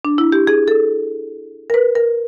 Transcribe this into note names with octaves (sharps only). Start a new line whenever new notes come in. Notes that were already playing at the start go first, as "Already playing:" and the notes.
D4
E4
G4
G#4
A4
A#4
B4
A#4